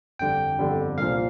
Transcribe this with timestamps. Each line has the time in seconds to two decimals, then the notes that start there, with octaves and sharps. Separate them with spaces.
0.19 G1 F2 D3 G3 G5
0.59 G1 F2 D3 G3
0.97 C2 A#2 F3 F5